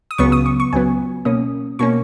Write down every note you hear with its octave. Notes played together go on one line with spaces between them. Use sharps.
D#6
C#2 C#3 F#3 B3 C#6
D#6
C#6
C#6
C#2 C#3 F#3 B3 G#5
B2 A#3 C#4 D#6
B2 A#3 C#4 C#6